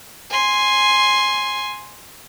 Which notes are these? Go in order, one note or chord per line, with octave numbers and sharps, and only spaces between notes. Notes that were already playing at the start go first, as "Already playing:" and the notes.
G#5 C6